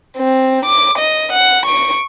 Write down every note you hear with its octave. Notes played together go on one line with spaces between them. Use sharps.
C4
D6
D#5
F#5
C#6 D7